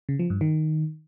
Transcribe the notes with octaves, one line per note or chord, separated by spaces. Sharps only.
C#3
F3
G2
D#3